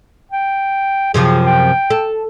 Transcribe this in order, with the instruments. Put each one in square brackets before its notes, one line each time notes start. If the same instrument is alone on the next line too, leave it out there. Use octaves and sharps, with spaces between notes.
[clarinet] G5
[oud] F#2 C3 F3 [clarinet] G#4
[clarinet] G5
[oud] A4